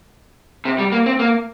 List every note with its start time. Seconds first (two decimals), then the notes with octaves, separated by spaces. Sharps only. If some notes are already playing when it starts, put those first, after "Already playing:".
0.65 C3
0.79 G3
0.92 A#3
1.06 C4
1.19 A#3